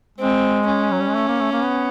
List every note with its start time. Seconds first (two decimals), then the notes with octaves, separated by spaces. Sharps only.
0.18 G#3 C4
0.67 C#4
0.92 F#3
1.00 G3
1.08 G#3
1.15 A3
1.28 A#3
1.40 A3
1.52 A#3
1.63 B3